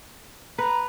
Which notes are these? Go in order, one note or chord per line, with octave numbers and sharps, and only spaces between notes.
B4 A#5